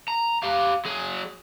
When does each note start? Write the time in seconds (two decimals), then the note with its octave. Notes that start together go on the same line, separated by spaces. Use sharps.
0.08 A#5
0.43 G4 F5
0.85 F#3 G#4